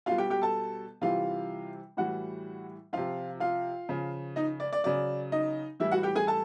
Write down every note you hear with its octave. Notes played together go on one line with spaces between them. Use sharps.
B2 G3 F4 F5
G4 G5
G4 G5
A4 A5
C3 E3 G3 F4 F5
A2 E3 G3 F#4 F#5
C3 F3 F4 F5
F4 F5
C#3 F3
D#4 D#5
D5
D5
C#3 F#3 D5
D#4 D#5
A2 E3 G3 E4 E5
F#4 F#5
G4 G5
G#4 G#5
A4 A5